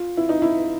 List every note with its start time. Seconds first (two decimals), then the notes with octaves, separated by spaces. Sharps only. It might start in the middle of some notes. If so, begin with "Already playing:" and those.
Already playing: F4
0.17 E4
0.29 D#4
0.42 E4